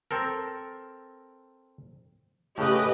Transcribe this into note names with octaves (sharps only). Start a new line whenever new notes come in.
C4 A4 A#4
A2 C#3 G4 B4 D#5